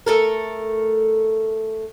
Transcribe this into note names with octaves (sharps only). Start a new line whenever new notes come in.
A3 A4 A#4